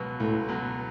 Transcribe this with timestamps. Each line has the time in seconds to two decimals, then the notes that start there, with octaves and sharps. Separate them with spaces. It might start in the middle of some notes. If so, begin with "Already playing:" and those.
Already playing: C#2 B2 F#3
0.20 C#2 A2
0.48 B2 F#3